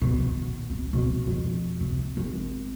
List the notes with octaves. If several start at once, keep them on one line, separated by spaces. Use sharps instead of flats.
B2
D#3
C4
B2
F2
C3
G#1